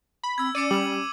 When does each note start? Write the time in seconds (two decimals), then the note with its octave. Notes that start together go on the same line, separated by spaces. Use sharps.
0.23 B5
0.38 C4 E6 G#6
0.55 C#4 D5 D6 C#7 D#7
0.71 G3 F#7